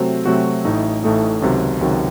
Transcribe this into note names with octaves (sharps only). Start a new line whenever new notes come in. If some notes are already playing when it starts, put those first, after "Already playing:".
Already playing: C3 F#3 A3 C4 F#4
C3 F#3 A3 C4 F#4
A1 A2 A3 D#4
A1 A2 A3 D#4
C#2 C3 D#3 F#3
C#2 C3 D#3 F#3